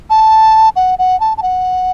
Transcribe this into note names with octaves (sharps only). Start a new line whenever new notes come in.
A5
F#5
F#5
A5
A5
F#5